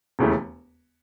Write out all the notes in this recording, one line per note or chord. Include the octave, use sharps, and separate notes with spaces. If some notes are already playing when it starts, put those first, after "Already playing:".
E1 D#2 C#3 E3 A3